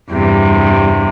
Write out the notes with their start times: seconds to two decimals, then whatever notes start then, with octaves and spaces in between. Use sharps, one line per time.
0.10 E2 G2 C3